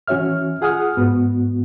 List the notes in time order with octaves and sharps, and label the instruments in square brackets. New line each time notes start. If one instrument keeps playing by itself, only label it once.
[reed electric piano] E3 C#4 F#4 C#5 E5 F6
F4 G#4 F#5 G#5 D#6 F6
G#2 B3 F#4